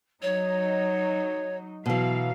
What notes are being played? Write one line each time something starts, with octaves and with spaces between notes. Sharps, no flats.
F#3 D#4 C#5
B2 E3 F#3 F5